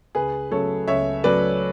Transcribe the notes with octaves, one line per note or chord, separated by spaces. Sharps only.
C#2 G#4 B4
C#3 F#3 A3 A4 C#5
C#2 C#5 E5
C#3 F#3 A3 B4 D5